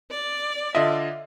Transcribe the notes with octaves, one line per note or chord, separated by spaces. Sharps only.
D5
D3 F4 D#5 E5